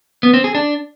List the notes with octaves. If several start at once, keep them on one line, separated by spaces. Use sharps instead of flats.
B3
C4
G#4
D4